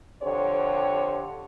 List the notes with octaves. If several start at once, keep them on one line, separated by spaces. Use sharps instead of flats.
F2 D3 G4 C5 C#5